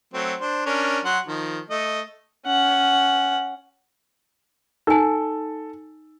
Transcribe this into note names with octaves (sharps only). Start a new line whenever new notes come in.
F#3 A3 C4
D4 C5
C#4 D4 A#4
F#3 F#5 C6
D#3 F3
A3 D#5
C#4 F#5
D#4 A4 G#5